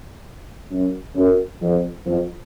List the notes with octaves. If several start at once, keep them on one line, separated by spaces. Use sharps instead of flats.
F#2
F#2
F2
F2